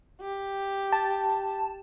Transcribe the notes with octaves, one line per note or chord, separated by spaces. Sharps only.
G4
A5